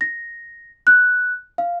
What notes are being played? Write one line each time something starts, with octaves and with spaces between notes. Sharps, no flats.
A#6
F#6
F5